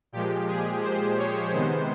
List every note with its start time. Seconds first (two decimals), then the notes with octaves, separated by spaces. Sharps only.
0.12 A#2 F3 G#3 G4
0.48 G#4
0.82 C5
1.17 C#5
1.52 C3 D#3 G#3 B3 C5